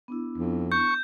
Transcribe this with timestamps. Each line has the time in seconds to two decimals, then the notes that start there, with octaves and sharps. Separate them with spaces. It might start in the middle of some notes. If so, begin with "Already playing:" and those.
0.08 B3 D4 E4
0.37 F2
0.72 C#6 G6